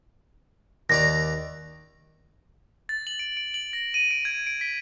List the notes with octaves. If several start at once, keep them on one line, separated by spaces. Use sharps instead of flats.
D#2 D5 A#5 A#6
A6
F#7
D7
D7
F#7
A#6
D#7
D7
G#6
D7
B6